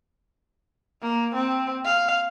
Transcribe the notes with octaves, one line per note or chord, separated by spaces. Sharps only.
A#3
C4
F5